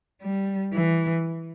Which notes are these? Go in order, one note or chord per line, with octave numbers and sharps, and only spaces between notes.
G3
E3